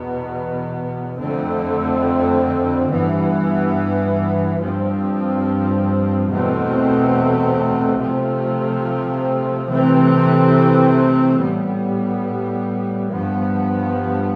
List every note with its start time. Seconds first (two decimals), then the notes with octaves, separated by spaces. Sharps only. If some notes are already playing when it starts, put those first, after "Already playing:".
Already playing: E2 B2 B3
1.18 F2 D3 A3 C4
2.89 G2 E3 B3
4.59 G2 F3 C4
6.29 E2 B2 A3 C4
7.99 C3 F3 A3 C4
9.69 C3 E3 A3 C4
11.40 A2 G3 B3
13.10 G2 F3 B3